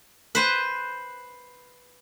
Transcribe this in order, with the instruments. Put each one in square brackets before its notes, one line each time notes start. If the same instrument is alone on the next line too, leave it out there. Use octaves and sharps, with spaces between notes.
[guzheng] B4 C5 G#5